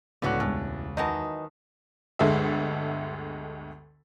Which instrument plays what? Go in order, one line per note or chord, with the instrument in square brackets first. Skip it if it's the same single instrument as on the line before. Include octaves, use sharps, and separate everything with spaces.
[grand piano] C#2 C#4 F#6 [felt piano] A2 [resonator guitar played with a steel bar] D3 B3 F#4
[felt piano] E1 G3 G#5 [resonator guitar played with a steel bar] A2
[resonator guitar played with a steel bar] D#3 A5 [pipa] E3 F#3 D#4
[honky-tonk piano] G1 D2 G#3 A4 E5